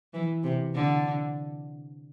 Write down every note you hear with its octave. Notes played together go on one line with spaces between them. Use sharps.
E3
C3
D3